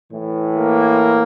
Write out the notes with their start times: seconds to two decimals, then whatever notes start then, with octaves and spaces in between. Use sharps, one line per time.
0.12 A2 E3
0.54 A#3